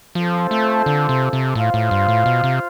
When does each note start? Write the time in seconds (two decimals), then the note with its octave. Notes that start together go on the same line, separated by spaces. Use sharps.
0.15 F3 C4 F4 A4 C5
0.51 A3
0.86 D3
1.09 C3
1.33 C3
1.55 A2 F4 C5 F5
1.74 A2
1.91 G2
2.08 A2
2.26 B2
2.44 C3